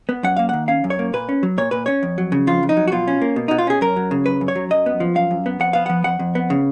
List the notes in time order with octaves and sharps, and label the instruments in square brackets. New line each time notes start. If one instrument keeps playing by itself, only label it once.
[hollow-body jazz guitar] B3
F#2 F#5
A#3 F5
D#3 F#5
C#4 F5
F#2
C#5
A#3
A#2 B4
C#4
F#3
A#2 C#5
A#2 B4
C#4 C#5
F2
F#3
C#3
F2 F4
F2
D#4
F#3
F#4
B2 F4
C#4
A#3
B2
B2 D#4
F4
C#4 G#4
F#2 A#4
F#3
C#3
F#2 B4
F#2
C#5
F#3
F#2 D#5
B3
F3
F#2 F5
F#2
B3
F2 F#5
B3 F5
F3 F#5
F2 F#5
F2
B3
C#3